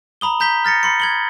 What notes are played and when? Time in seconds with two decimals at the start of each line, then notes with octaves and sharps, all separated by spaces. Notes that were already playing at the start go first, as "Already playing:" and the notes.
0.21 A#5 B5 D#6 G7
0.40 A#5 G6 B6 G7
0.65 F6 A6 A#6 C#7
0.83 B5 C6 C#7
1.00 G#6 F#7 G7